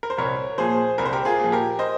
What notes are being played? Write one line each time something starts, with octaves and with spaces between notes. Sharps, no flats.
A#4
C5
C2 A#4 C#5
A#2 F3 G#4 C5
C2 A#4
C5
G4 A#4
F4 G#4
A#2 F3
G4 A#4
C5 D#5